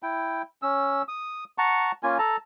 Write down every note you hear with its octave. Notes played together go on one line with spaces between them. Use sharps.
E4 G5
C#4 E6
D#6
F#5 A5 A#5 C#6
A#3 C#4 F4 G#5
A4 A5 A#5